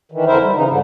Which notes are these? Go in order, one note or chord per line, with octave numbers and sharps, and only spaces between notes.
D#3 E3
F2 D3 E4 A#4 C5 E5
G3
C#3 E3 D#4
G#2 D3